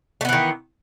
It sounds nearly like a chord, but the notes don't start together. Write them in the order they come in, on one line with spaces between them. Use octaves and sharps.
A3 B3 E3 D#3